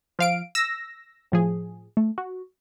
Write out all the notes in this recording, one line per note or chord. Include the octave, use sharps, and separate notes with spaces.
F3 F5 D7
E6 A#6
A2 F3 G#4
A3
F#4